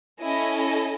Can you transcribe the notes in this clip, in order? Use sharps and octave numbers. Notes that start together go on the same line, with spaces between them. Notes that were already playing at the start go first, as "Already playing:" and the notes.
C#4 E4 A4 D#5 G#5